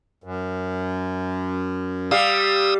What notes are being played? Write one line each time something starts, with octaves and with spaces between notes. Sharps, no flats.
F#2
G3 F5 D#6 E6